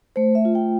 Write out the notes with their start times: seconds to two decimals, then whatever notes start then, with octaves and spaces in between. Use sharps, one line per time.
0.16 A3 C5
0.35 E5
0.45 F4
0.55 G5